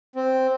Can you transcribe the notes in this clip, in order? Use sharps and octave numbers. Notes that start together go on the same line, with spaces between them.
C4